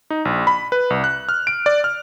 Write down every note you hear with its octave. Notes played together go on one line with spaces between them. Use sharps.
D#4
A#1
B5
B4
C2
F#6
F6
D7
D5
F6